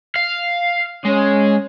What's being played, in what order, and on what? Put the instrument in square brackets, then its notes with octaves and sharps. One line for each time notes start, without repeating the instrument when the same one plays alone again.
[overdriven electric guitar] F5
[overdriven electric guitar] G#3 [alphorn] C#4